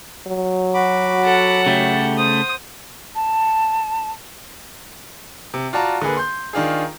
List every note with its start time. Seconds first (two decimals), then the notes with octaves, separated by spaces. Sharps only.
0.27 F#3
0.74 F#4 B5 D6
1.24 A4 F#5
1.66 C#3 A3 G4
2.18 C5 D#6
3.15 A5
5.54 C3
5.73 F4 F#4 D5 A5 A#5
6.02 D3 A#3 G#4 B4
6.17 C6 G6
6.53 D#3 D4 F4 G#4